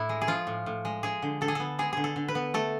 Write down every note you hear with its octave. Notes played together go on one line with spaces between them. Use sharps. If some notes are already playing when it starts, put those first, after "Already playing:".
Already playing: A2 E4
G#3
G#4
F3 F4
A2
A2
G#3
G#3 G#4
D3
D3 A4
G#4
B3 A4
G#3 G#4
D3 G#4
A4
D3
B4
B3
A3 A4